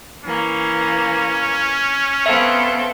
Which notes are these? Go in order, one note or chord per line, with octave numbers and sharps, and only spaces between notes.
E3 A#3 C#4
B3 C4 A4 E5 F5